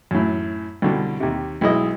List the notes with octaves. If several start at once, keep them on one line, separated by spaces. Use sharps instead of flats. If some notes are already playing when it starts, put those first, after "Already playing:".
F#2 A2
C2 B2 D3
D#2 C3
B1 G#3 E4 D#5 D#6